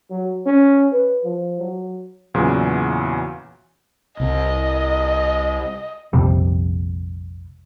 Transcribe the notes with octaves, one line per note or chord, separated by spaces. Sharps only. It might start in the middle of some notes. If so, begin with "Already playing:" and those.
F#3
C#4
B4
F3
F#3
E2 A#2 C#3 E3 F#3
C2 D#5
A#1 F2 C3 G3